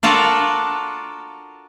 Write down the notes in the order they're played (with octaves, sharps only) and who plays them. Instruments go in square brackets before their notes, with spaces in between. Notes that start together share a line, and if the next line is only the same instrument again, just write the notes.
[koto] D4 F4 F#4 A4 A#4